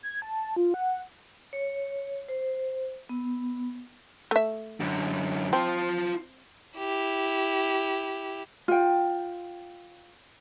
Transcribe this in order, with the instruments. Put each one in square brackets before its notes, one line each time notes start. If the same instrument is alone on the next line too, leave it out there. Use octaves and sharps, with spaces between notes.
[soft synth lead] G#6
A5
F4
F#5
[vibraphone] C#5
C5
B3
[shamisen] A3 E5
[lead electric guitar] F#2 D3
[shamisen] C4 [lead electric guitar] F4 A5
[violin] E4 G4
[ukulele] F4 G5